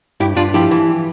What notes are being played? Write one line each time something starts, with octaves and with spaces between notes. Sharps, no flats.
G2 E4 G4
G2 D4 F4
F3 E4 G4
E3